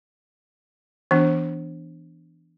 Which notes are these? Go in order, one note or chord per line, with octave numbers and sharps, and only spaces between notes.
E3 B3 D4